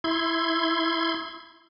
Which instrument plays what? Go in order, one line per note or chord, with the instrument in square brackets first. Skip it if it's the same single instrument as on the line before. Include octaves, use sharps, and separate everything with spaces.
[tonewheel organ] E4 C6 G#6